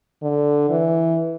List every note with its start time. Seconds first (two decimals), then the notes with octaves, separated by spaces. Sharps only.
0.22 D3
0.70 E3